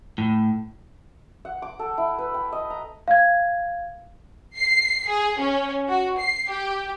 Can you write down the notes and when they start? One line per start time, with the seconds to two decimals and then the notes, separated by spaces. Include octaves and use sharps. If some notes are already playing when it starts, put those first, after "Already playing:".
0.18 A2
1.45 F#5
1.62 D6
1.79 A4
1.98 E4
2.18 B4
2.34 G5
2.52 D#5
2.70 A#5
3.08 F5 G#6
4.57 C7
5.08 G#4
5.39 C#4
5.88 F#4
6.18 C7
6.48 G4